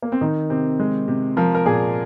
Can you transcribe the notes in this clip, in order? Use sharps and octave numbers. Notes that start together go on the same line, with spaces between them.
A#3
C4
D#3 D#4
C3 C4
G#3
C3
F3 A#4
A#4
A#2 G#4